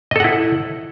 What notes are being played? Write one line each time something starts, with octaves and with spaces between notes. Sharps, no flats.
E4 A4 D#5 F#5